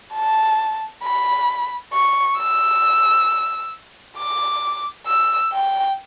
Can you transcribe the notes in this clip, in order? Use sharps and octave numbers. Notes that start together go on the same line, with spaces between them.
A5
B5
C#6
E6
D6
E6
G5